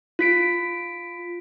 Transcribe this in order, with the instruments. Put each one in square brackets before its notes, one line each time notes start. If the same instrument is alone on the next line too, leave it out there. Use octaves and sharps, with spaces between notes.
[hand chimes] F4 B6 D7